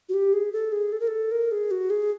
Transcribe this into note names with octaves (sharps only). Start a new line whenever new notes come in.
F#4
G4
G#4
A4
G#4
A4
A#4
A4
A#4
G#4
F#4
G#4